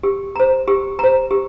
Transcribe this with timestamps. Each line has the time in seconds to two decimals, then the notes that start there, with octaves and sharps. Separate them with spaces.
0.03 G4
0.36 C5 A#5
0.68 G4
0.99 C5 A#5
1.31 G4